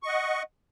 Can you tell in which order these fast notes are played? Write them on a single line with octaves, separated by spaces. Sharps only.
C#6 D#5 F#5